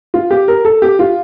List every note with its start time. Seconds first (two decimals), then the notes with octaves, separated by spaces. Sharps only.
0.14 F4
0.31 G4
0.48 A#4
0.65 A4
0.82 G4
0.99 F4